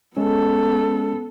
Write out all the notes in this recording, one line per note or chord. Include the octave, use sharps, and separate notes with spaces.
G#3 B3 C#4 A4